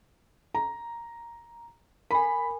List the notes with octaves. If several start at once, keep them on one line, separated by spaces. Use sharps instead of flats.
A#5
A#4 G#5 B5